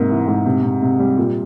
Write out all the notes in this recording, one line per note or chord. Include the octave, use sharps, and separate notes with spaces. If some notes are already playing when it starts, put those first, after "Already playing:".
Already playing: G#2 C3 A#3
E3
G#2
C3
C3
C3
G3
A#2